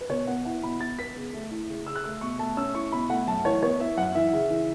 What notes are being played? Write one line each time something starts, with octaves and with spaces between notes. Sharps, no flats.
B4
B2 C#5
B3 F#5
E4 F#5
B2 B5
B2 A6
B3 B6
C#3
A3
E4
C#3
C#3 E6
F#6
A3 E6
B2 C#6
A3 A5
C#4 E6
E4 C#6
B2 B5
A3 F#5
F#2 A5
E3 C#5
B3 C#5
E4 E5
F#2 F#5
E3 E5
C#3
E3